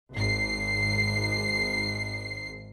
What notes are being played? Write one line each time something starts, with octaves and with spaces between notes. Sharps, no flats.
G#1 C7